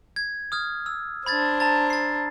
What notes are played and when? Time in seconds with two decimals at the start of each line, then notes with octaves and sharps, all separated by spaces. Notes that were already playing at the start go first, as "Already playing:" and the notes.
0.16 G#6
0.52 D#6 F6 G#6
0.86 E6
1.26 D4 C5 B5 G#6 A6
1.60 A5 A#5 A6
1.90 A6 C7